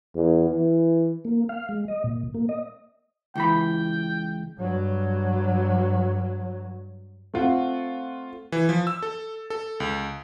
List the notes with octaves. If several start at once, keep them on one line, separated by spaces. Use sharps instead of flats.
E2
E3
A#3
F5
G#3
D#5
A#2
A#3
D#5
C#2 E3 G5 B5
G2 F#3
A3 C4 F4 F#5
E3
F3
E6
A4
A4
C#2